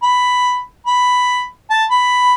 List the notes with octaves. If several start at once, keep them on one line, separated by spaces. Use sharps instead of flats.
B5
B5
A5
B5